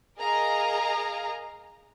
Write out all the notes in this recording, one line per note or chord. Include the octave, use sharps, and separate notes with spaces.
G#4 A#4 D#5 F5 A#5